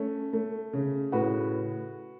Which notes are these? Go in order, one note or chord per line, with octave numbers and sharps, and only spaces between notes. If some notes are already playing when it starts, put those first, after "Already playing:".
Already playing: A3 C#4
A3
C#3
A2 F#4 B4